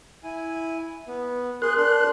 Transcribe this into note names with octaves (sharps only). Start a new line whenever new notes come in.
E4 G#5
B3
G#4 A#4 C6 F#6
D4 C6